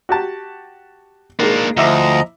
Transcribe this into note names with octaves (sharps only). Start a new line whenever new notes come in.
F#4 G4 A5
D#3 G#3 A#3 D4
D2 F3 E4 D#5 E5 A#5 D6